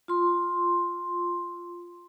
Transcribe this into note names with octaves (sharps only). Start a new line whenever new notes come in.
F4 C6